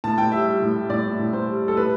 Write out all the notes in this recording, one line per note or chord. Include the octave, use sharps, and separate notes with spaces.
A2 A5
A2 G5
G3 E5
G3
A2
G3
A2 D5
A2
A2
A2 C5
G3
G3
A4
A2 B4